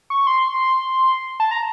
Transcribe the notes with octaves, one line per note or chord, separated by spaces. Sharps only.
C#6
C6
A5
A#5